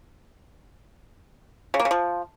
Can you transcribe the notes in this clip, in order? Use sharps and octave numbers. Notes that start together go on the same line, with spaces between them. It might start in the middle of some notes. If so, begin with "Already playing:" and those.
C#3
A#3
C#3
F3